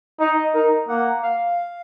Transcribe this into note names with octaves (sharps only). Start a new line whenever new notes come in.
D#4 D#5
D#4 A#4
A#3 F#5
F5